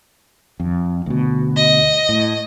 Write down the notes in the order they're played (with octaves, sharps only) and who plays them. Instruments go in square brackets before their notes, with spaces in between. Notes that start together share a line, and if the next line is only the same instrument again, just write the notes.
[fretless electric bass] F2
D2 B2
[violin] D#5
[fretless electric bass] A2